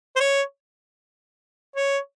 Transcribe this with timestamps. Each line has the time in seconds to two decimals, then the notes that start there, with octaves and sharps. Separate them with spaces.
0.16 C5
0.20 C#5
1.76 C#5